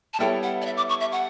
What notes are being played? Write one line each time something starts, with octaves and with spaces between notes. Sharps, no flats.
A5
G3 B3 E4 A4 C#5 G5
F#5
D5
E5
D6
C#6
E5
F#5